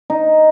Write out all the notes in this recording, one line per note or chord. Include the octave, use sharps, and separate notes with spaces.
D#4